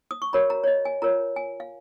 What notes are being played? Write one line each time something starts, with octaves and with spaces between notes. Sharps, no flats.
D#6
C#6
F#4 A#4 C#5 B5
A#5
C#5
D#5
G#5
F4 A#4 C#5 A#5
G#5
F5